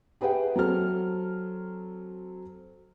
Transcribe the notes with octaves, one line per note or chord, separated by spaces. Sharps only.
G4 G#4 B4 E5 F#5 G5
F#3 C4 A4 F6